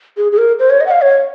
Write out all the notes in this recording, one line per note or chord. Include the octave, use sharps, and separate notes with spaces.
G#4
G#4
A#4
C5
C#5
D#5
F#5
F5
C#5